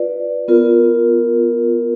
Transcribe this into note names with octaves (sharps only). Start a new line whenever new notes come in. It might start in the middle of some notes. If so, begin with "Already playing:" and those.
Already playing: F4 B4 D5
B3 F4 A#4